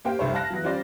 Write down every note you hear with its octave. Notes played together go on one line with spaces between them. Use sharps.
A#3 G4 C5 F5 G5
F1 C2 C5 C#5
F5 A5 F#6 A#6
E2 F#3
G3 C#4 F4 C5 D5